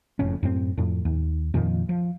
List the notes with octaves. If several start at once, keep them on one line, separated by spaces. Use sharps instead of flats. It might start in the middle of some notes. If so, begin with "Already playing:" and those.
F#1 F2 A2 C#4
F#2 A2 C4
F2 A2
D#2
F2 A#2 D#3 F3
F3